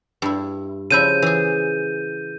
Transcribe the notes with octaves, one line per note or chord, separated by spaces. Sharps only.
G2 E4
C#3 F3 E4 G6 D#7
E3 G#4